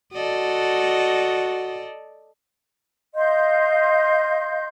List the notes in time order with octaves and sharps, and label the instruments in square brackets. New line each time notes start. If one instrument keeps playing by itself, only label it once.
[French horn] F#4 [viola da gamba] A4 D5 D#5
[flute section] D#5 F5 C6 G6